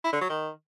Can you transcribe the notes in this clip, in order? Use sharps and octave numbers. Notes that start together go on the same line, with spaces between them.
E4
D3
F#3
D#3